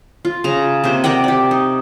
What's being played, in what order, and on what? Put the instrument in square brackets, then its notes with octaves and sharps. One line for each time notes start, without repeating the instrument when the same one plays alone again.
[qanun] F4
C#3 A#5
C3 A#3 C5
A#4 D5 F#5 G5
G4 D5
D#4